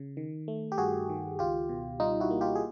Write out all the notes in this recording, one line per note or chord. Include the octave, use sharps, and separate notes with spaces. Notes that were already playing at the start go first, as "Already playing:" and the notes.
Already playing: C#3
D#3
A3
G4
G2 F#4 G#4
D#3
C#2 F4 G4
B2
G3 D#4 F4
E4 F#4
A#3
F4 G4
G#4